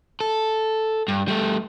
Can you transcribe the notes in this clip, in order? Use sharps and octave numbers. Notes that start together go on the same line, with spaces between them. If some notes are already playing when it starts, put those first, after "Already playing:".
A4
G2
G3 A3